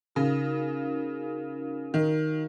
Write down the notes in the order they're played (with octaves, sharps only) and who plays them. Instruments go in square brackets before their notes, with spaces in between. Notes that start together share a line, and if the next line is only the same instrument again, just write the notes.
[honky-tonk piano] C#3 [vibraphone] D#4 F#4 A#4 F5
[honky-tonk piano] D#3